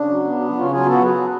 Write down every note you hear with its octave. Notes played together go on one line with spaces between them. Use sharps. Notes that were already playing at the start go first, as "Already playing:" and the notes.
Already playing: C#3 D4
F#3
B3
C#3
C#3 C#4 F4
F#3 F4 G#4
B3 F#4 A4
F#3 G#4 B4
F#3